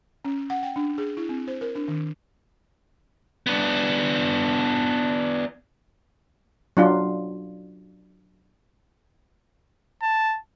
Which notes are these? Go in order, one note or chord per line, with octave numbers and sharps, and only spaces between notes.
C#4
F#5
G5
D4
G#4
E4
C4
C5
A#4
D4
D#3
B3 D4
F#3 D4 F4
A5